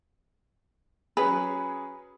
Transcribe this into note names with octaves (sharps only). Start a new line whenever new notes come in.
F#3 C#4 G#4 B4